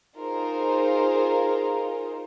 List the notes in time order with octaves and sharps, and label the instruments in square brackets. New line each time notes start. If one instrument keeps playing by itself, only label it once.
[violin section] D#4 F4 G#4 A#4 C5